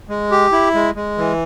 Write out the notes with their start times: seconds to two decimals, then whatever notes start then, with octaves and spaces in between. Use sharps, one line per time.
0.09 G#3
0.31 G4
0.52 E4
0.74 G#3
0.95 G#3
1.18 E3